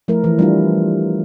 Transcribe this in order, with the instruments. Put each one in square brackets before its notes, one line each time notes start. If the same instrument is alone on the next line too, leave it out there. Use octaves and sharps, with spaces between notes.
[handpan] F3 A3 E4 A#4
E3
G3 D4 F4